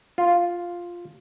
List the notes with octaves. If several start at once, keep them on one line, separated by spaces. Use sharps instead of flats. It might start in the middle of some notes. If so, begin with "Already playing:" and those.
F4